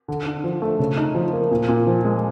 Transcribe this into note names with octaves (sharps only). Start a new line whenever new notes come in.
D3
D4
F3
A3
C#3
D#4
F3
A#3
A#2
A#2
F3
G#3